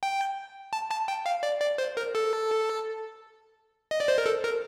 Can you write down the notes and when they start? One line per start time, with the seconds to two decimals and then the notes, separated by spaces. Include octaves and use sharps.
0.03 G5
0.73 A5
0.91 A5
1.08 G5
1.26 F5
1.43 D5
1.61 D5
1.78 C5
1.97 A#4
2.15 A4
3.91 D#5
4.00 D5
4.08 C5
4.18 A#4
4.26 A4
4.44 A#4